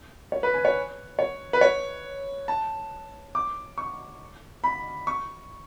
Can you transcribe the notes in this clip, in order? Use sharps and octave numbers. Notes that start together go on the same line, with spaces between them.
C#5
B4
G#5
C#5
C#5
B4
C#5
A5
D6
C#6
B5
C#6